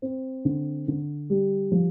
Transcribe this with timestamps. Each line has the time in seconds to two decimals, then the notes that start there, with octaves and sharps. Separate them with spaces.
0.02 C4
0.45 D3
0.88 D3
1.30 G3
1.72 F3